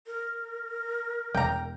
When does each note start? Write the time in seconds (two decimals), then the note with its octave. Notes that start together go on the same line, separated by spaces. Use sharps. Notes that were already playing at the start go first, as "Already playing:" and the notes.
0.06 A#4
1.35 E1 G5 A#5